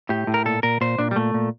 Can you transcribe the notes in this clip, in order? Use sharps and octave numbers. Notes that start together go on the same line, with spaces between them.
A2 G4
A2
A#4
A#2 A4
A#2 A#4
A#2 C5
A#2 D4
G3
A#2 A3
A#2